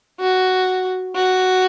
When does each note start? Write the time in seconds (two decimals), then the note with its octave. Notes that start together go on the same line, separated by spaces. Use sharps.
0.20 F#4
1.15 F#4